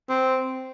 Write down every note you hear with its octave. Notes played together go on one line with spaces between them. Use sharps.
C4